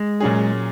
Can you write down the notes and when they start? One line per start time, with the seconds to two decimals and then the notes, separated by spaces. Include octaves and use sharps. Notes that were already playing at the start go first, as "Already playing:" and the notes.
Already playing: G#3
0.20 A#2 F#3 C#4 G#4